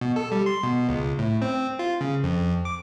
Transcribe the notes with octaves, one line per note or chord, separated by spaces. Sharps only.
B2
A4
G3
C6
B2
C#2
A2
C4
F4
C#3
F2
D6